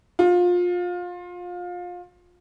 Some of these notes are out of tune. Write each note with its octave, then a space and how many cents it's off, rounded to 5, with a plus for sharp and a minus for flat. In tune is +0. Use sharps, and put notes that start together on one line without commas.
F4 +25